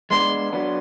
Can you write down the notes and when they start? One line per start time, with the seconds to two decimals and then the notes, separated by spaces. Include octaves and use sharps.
0.11 G#3 B3 D4 C6
0.53 F#3 B3 D4